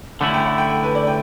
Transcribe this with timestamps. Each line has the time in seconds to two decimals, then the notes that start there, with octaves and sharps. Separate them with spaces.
0.20 D3 A3 C#4 E4 F#5
0.34 G5
0.46 F#5
0.58 G5
0.70 G5
0.83 B4
0.95 D5
1.07 G5